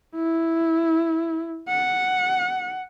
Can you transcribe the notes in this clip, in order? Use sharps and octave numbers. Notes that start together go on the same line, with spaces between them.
E4
F#5